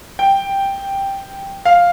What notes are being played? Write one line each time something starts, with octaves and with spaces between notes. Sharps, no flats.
G5
F5